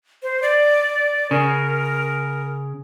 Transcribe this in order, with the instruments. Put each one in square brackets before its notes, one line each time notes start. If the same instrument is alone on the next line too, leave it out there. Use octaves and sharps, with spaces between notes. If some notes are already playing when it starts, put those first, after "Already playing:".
[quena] C5
D5
[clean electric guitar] C#3 [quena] A#4